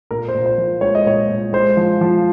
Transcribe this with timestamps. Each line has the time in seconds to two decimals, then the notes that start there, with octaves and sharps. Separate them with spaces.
0.11 A#2 A#4
0.29 C5
0.34 A#2
0.46 C5
0.58 F3
0.81 G#3 C#5
0.95 D#5
1.06 A#2 C#5
1.29 A#2
1.53 G#3 C5
1.77 F3
2.01 F3